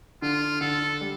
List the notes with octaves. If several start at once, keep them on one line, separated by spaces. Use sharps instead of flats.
D3 F4
D3 A4
G3